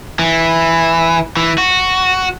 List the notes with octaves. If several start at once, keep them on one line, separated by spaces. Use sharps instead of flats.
E3
E3
F#4